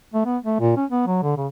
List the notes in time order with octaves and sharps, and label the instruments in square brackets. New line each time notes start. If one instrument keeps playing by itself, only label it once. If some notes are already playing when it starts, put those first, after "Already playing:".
[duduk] A3
B3
A3
A#2
C#4
B3
F#3
D3
C#3